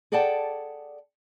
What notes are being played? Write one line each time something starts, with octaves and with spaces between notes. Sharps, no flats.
G#4 A4 D5 F#5 G5 A5